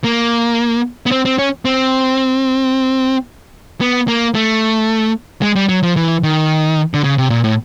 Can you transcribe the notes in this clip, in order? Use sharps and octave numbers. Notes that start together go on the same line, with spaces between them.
A#3
B3
C4
C4
C#4
C4
B3
A#3
A3
G#3
G3
F#3
F3
E3
D#3
D3
C#3
C3
A#2
A2